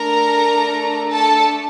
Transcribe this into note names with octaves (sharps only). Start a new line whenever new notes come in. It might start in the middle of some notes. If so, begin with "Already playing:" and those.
Already playing: A3 D4 A4 A#4 A#5
A4 A5